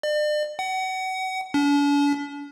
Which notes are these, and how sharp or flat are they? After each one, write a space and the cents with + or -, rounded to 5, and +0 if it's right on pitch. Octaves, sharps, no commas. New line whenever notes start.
D5 +40
F#5 +30
D4 -45